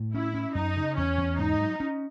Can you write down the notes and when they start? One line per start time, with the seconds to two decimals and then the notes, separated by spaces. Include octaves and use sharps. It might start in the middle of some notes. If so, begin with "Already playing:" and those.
Already playing: A2
0.14 C#4 E4
0.34 C#4
0.55 F#2 D#4
0.77 C#3
0.96 E2 C#4
1.18 E2
1.39 G#2 D#4
1.60 F#3
1.80 C#4